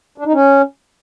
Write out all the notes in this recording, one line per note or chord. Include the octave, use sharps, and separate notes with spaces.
D4
D#4
C#4